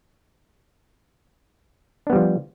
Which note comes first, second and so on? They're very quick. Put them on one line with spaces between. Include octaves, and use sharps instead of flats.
D4 B3 G3 F3